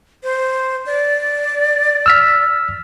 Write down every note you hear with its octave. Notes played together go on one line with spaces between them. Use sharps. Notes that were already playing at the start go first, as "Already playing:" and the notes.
C5
D5
E6 F6 B6